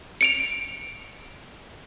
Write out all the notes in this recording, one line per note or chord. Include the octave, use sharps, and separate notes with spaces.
C#7 D7 F7